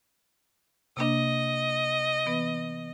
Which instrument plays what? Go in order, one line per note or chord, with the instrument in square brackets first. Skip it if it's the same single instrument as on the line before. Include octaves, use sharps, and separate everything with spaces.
[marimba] C3 A#3 D4 [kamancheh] D#5
[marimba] E3 B3 B4